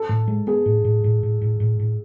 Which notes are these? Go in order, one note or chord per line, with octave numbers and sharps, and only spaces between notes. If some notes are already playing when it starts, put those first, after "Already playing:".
Already playing: A4
A2
G#3
B3 G#4
A2
A2
A2
A2
A2
A2
A2